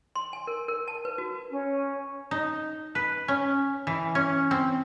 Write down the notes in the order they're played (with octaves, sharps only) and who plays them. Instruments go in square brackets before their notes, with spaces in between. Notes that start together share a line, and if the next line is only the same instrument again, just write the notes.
[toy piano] C6
G#5
A#4
A#4
A5
B4
F#4
[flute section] C#4
[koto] D#4
B4
C#4
E3
C#4
C4